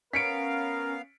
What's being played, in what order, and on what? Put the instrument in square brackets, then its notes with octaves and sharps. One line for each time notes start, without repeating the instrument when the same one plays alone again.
[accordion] B3 F5 [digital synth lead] C#4 [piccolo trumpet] A#4 [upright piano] B6 C#7 D7